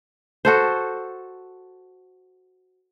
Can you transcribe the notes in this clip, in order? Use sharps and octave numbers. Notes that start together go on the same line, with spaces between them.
F#4 A4 C5